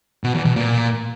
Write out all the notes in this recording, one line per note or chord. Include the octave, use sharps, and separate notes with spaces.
B2
E2
B2
A#2